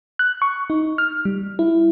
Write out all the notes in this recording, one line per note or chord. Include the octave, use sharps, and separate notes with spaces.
F#6
C#6
D#4
F6
G3
E4